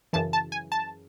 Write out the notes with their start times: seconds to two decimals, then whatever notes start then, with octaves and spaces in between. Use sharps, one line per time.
0.13 F#2 C#3 E3 A5
0.33 A5
0.52 G#5
0.72 A5